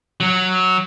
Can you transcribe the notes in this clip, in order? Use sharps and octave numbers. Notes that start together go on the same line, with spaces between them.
F#3